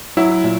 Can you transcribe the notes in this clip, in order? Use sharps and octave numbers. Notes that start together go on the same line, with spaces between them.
F#3 E4
A#2